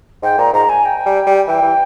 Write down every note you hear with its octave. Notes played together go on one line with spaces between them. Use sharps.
G#2 G5
A#2 A#5
G#2 A#5
G#5
G5
G3
G3
E3 G5
E3